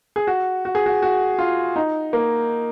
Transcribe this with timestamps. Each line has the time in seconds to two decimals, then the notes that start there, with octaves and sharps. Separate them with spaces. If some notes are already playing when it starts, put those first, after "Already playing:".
0.16 G#4
0.27 F#4
0.65 F#4
0.75 G#4
0.86 F#4
1.02 F#4
1.39 F4
1.76 D#4
2.13 A#3